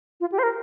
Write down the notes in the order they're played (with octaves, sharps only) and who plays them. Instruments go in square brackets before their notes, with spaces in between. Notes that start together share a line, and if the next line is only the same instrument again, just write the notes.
[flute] F4
G4
C5
A#4